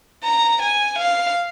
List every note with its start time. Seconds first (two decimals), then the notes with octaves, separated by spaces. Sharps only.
0.24 A#5
0.62 G#5
0.99 F5